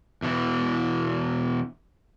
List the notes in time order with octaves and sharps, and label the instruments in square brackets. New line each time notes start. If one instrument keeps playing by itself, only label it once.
[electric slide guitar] E2 B2 D3 E3